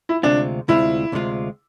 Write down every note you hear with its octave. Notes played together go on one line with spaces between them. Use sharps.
E4
D2 C3 G#3 C4 D4 F4
D2 C3 G#3 C4 E4 F4
D2 C3 G#3 C4 F4